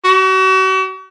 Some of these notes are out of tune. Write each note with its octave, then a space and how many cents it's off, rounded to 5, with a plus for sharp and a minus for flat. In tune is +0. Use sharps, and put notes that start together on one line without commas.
F#4 +40